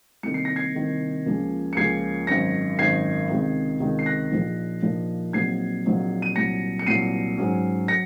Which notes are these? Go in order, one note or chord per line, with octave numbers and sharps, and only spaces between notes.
C2 C3 D#3 A#3 C#7
C7
A#6
G#6 C7
C2 C3 D#3 A#3
C#2 C#3 F3 A#3 C#4
C#7
C#2 C#3 F3 A#3 C#4 G#6 C7
G#1 F#2 D#3 A#6 C#7
G#1 F#2 D#3 G#6 C7
C#2 C3 D#3
C#2 C3 D#3
C7
F#6 A#6
A#1 A#2 F3 A#3 D#4
A#1 A#2 F3 A#3 D#4
A#1 A#2 F#3 C4 D#4 G#6 C7
A#1 A#2 F#3 C4 D#4
D#7
C2 A#2 F#3 A#6 C#7
C#7
C2 A#2 F#3 C7 D#7
G#2 F#3 C#4
F#3 A#6 C#7